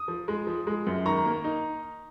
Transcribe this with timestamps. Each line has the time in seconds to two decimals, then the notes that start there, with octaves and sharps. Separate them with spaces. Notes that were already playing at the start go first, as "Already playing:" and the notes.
Already playing: D#6
0.08 F3
0.28 G#3
0.47 F3
0.67 G#3
0.87 F#2
1.06 D#3 A#5 C#6
1.25 A#3
1.44 D#4